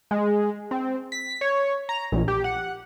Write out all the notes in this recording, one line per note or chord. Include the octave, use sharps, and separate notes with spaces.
G#3
C4
B6
C#5
A#5
A#1
G4
F#5